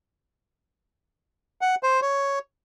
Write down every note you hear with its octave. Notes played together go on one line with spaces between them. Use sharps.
F#5
C5
C#5